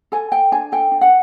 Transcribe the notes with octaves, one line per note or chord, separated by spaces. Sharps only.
A4 G#5
A4 G5
D4 G#5
A4 G5
D4
F#5